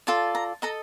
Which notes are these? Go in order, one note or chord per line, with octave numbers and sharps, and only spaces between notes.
F4 A4 D5 A5
A#5
A4 D#5 A#5